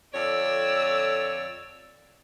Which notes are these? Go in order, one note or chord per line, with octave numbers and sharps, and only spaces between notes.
F2 D3 C#5 D5 E6